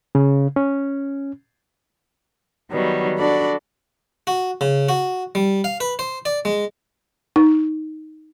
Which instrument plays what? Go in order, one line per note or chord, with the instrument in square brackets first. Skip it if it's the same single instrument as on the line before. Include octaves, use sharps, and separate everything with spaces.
[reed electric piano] C#3
C#4
[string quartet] D#3 F#3 G3 B3
D4 F#4 A4 D5 B5
[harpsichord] F#4
C#3
F#4
G3
F5
B4
C5
D5
G#3
[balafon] D#4